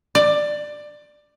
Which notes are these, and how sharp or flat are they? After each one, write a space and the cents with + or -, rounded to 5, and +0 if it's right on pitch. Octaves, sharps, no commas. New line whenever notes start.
D5 +15